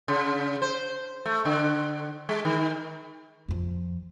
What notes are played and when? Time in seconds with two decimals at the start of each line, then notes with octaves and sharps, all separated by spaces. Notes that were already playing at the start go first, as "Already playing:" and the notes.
0.08 C#3
0.62 C5
1.26 A3
1.45 D3
2.29 G#3
2.45 D#3
3.48 F2 F3